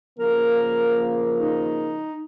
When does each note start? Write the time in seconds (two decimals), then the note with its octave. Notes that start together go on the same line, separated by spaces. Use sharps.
0.19 C#3 F3 A#3 A#4
1.40 D#4